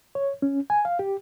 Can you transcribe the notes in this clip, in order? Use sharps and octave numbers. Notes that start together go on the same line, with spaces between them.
C#5
C#4
G#5
F5
G4